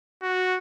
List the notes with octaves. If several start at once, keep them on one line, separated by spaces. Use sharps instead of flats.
F#4